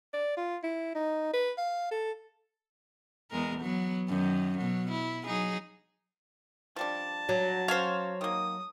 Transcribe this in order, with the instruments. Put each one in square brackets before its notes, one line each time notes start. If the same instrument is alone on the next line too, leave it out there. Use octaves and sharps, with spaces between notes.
[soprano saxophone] D5
F4
E4
D#4
B4
F5
A4
[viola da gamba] E2 G#3 A#4
F#3 B3
F#2 D#3
B2 F#3
E4
F#3 D#4 G#4
[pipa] F3 G3 D4 [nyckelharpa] A5
[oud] F#3
[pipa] C#4 F5 [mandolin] C5 C#5
[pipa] D#3 A#3 [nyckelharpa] D#6